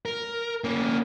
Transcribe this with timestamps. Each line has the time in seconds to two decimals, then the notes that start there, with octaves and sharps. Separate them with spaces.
0.06 A#4
0.64 A#3 C#4